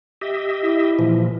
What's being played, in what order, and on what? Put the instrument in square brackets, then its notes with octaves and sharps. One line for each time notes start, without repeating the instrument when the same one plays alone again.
[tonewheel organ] G4 D#5 E5
[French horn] E4
[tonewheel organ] A#2 E3 F3